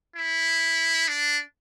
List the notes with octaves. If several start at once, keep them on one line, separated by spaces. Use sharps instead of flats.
E4
D4